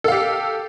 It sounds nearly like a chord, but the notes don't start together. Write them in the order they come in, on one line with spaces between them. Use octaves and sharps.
A4 F5 G4